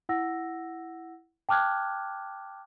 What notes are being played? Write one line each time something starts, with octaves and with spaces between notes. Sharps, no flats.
E4 F#5 E6 A#6
G5 A5 D6 F6 F#6 G#6